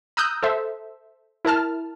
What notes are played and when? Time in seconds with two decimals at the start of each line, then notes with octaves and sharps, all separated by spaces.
0.17 A#5 D#6 E6 F#6 G6
0.43 A4 C5 E5
1.45 E4 A#4 A5 F6